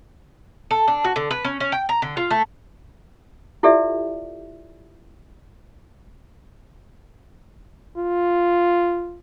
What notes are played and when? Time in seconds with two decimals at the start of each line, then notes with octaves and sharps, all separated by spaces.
0.71 A4
0.88 D4
1.04 F#4
1.16 D3
1.31 B4
1.44 C#4
1.60 C#4
1.72 G5
1.89 A#5
2.02 D3
2.17 F4
2.31 A3
3.63 E4 F4 G4 A4 D5 E5
7.97 F4